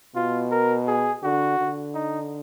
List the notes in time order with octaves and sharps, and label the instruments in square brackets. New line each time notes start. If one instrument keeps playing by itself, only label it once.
[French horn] B2 [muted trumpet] F4
[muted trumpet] A#4
G#4
[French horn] D3 [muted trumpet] F#4
[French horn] D3
[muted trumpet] D#4